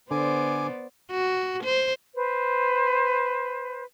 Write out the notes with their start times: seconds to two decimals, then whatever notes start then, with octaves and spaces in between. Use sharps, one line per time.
0.11 D3 B3 C5 D5 G#5 D6
1.11 F#4
1.64 C5
2.14 B4 C5